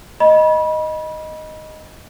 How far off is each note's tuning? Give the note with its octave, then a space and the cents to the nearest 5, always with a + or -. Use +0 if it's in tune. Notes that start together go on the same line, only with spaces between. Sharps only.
D#5 +0 B5 -30